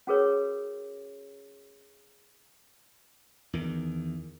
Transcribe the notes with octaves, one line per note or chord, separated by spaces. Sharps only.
C#4 F#4 G#4 A#4 B4 C#5
E2 D#3